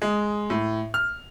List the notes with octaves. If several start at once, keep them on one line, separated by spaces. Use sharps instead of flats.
G#3
A2
F6